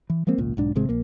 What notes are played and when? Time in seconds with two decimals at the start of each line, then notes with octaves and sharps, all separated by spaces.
0.10 E3
0.27 F3 G#3 A#3 C4
0.38 G#1 C#2 A#2
0.57 B1 G#2 D4
0.76 G#1 C3 G#3 C4
0.89 A#1 A#3